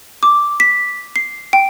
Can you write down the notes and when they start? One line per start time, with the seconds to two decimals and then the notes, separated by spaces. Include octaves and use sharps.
0.23 D6
0.60 B6
1.16 C7
1.53 G5